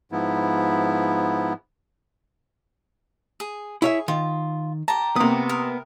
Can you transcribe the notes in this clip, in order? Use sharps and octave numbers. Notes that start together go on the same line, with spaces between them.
G#2 F3 B3 E4
G#4
E4 G#4 C#5 E5
D#3 F4
G4 A5 A#5
C3 A#3 B3 D#6
A#4